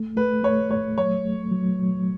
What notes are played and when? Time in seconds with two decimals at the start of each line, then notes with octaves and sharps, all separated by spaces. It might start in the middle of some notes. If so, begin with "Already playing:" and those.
Already playing: A3
0.16 A3 B4
0.43 A3 C#5
0.70 A3 C#5
0.98 F#3 C#5
1.24 A3
1.51 F#3
1.78 F#3